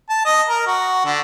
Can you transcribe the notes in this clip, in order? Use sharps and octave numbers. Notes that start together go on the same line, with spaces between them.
A5
D#5
A#4
F#4
D3